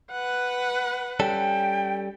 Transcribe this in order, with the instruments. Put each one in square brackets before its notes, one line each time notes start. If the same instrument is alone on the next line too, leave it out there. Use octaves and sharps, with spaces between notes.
[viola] B4 F#5
[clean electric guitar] G3 C#4 A4 [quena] G5